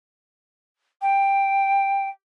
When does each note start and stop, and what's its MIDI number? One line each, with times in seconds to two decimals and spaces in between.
1.01 2.08 79